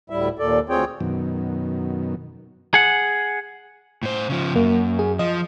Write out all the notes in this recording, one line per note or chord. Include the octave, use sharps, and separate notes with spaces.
D2 A2 G3 E4 E5
D#2 A#2 A4 D5
D2 C4 F4 G#4 C#5 G5
F#2 B2 D#3
G#4 F#5
A2 C5
C#3 F3
F#2 A#3
G#4
F3 D#5